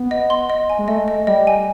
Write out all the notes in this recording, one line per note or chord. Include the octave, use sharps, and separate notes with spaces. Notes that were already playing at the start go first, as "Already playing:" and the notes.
Already playing: B3
D#5
C6
D#5
G#5
G#3
A3 D#5
D#5
G3 D#5
G#5